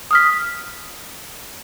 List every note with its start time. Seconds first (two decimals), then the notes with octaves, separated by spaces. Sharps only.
0.11 D#6 F6 B6